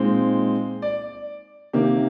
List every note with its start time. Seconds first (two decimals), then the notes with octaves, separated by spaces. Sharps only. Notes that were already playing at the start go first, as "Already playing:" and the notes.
Already playing: A#2 G#3 C4 D#4
0.82 D5
1.73 C3 D#3 A#3 G4